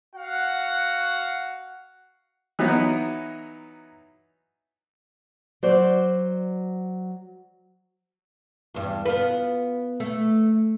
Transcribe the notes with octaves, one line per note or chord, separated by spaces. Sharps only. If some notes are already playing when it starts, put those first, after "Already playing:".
F#4 F5 F#5
E3 F#3 B3 D#4 E4
F#3 C5 D5
E2 G2
B3 F4 B4
A3